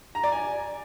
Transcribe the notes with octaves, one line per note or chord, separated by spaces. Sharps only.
A#5
D5
G#5